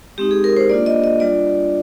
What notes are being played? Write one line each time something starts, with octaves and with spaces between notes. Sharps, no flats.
G#3 C4 D#4 G4
G#4
A#4
C5
A#3 D4 F4 D5
D#5
D#5
G3 D4 F4 D5